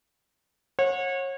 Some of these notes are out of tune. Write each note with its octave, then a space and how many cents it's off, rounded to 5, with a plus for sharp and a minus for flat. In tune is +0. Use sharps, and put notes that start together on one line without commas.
C#5 -30 F#5 -30